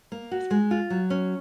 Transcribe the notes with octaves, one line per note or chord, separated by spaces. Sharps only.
A#3
F#4
G#3
F4
F#3
C#4